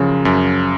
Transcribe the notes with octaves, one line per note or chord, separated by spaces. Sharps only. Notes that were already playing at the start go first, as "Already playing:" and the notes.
Already playing: F#2 C#3 F3
F#2